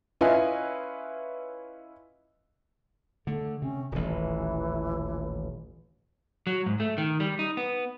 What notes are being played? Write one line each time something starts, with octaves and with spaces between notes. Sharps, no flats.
C#4 E4 F4 B4 D#5 G#5
D3 A3 A4
C3 C#4
D#1 A1 E3
F#3
G#2
A3
D#3
G3
D#4
B3